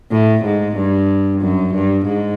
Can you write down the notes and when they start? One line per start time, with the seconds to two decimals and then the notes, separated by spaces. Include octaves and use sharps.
0.12 A2
0.45 G#2
0.76 G2
1.41 F#2
1.74 G2
2.06 G#2